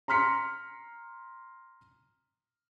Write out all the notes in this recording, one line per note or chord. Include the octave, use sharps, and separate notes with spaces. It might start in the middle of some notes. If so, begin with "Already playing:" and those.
A#5 C6 F6 B6 C#7